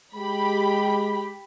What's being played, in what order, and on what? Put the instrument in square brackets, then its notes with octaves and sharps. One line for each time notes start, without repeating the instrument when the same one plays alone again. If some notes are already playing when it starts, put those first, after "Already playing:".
[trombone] G#3 [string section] G4 B5